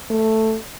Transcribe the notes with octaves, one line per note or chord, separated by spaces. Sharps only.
A3